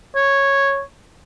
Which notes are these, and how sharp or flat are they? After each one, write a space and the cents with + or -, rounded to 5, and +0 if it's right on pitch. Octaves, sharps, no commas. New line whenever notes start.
C#5 -5